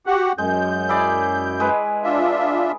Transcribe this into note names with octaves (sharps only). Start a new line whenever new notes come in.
F#4 G4 F#5
F#2 G#3 G6
E4 G#4 D5
G#3 B4
D4 F4 E5